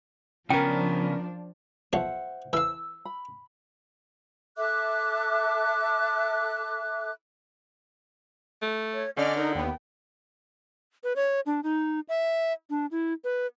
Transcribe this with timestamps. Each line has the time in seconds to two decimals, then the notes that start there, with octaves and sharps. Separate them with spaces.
0.50 C#3 F3 B3 C#4 D4 A#4 G5
1.93 B1 F3 C5 C#5 E5 F#5
2.53 E3 F5 E6
3.05 B5
4.57 A4 E5 D6 F#6
8.62 A3
8.94 C#5
9.17 D3 C#4 D5 D#5 F6
9.37 D#4 A#4
9.55 D#2 B3 G5
11.04 B4
11.16 C#5
11.46 D4
11.64 D#4
12.09 E5
12.70 D4
12.91 E4
13.24 B4